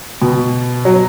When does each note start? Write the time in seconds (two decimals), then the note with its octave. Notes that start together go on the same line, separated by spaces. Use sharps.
0.22 B2
0.85 F#3